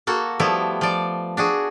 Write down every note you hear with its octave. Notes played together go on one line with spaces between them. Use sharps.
A#3 F#4 A4
F3 G3 A3 B3 E4
F3 D5
D4 F#4 G#4